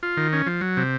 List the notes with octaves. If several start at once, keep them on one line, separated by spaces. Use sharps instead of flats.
F4
D#3
C#4
F3
F#3
C3